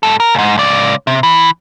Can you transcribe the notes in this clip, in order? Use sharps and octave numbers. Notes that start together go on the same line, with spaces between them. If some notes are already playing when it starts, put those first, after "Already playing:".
G#2 A4
A#4
C#2 G#2
C#2 D5
C3
E3